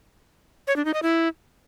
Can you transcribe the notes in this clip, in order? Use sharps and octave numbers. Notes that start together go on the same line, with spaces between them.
C#5
D4
D#4
D#5
E4